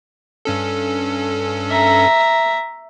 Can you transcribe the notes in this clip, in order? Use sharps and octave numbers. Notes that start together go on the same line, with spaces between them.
G2 C#4 A4
E5 A#5